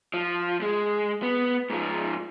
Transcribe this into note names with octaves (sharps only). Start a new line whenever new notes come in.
F3
G#3
B3
G#2 F3